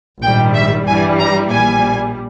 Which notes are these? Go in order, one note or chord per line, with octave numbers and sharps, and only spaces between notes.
A#1 G#2 D#3 G3 G5
E5
G2 E3 G3 G#5
A#5
A#1 A#2 G3 G#5